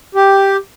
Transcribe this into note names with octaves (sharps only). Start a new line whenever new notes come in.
G4